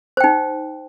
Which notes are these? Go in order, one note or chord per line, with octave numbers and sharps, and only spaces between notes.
D#4 C5 G5